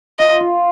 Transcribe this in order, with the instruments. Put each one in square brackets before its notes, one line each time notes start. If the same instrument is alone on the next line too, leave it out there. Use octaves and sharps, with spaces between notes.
[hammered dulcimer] F4 [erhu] D#5
[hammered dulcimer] F4